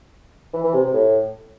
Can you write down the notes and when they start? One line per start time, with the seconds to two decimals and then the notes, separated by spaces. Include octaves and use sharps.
0.54 E3
0.64 E3
0.74 C3
0.84 C3
0.94 A2